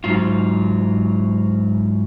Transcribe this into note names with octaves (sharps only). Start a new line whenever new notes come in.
G#2 F#3 F4